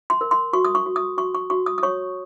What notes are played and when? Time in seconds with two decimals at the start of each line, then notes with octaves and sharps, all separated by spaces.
0.10 C6
0.21 A#4
0.31 C6
0.53 F#4 C#6
0.65 D#6
0.75 C#6
0.86 F#4
0.96 D#6
1.18 F#4 C#6
1.35 C#6
1.50 F#4 C#6
1.66 D#6
1.78 D#6
1.83 C#5 C#6